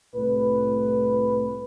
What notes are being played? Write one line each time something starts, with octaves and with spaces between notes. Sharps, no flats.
C2 A2 B4